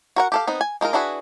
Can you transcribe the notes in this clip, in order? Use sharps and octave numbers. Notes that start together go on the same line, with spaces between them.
F#4 A#4 F#5
G4 A4 F5
B3 C4 D#4
G#5
G#3 D#4 F4 A#4
D4 E4 F#4 G#4 B4